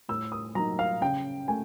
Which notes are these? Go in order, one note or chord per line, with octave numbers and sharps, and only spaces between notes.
A2 E6
D#6
F#3 A#3 D#4 A#5
F5
C#3 G5
A3 G#5